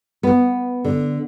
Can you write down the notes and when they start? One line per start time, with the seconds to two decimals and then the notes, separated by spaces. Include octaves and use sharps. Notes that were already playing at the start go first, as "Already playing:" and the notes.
0.23 B3
0.84 D3